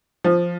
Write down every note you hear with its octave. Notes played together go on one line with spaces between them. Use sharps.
F3